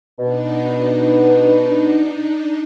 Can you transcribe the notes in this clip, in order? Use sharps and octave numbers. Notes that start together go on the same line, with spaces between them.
B2 D4 D#4